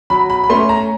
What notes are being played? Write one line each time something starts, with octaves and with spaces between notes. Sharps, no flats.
F#3 B5
B5
B5
A3 C#4 C6
A#5